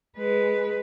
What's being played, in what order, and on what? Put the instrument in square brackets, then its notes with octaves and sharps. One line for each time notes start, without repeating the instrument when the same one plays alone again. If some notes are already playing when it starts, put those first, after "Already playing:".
[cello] G#3 B4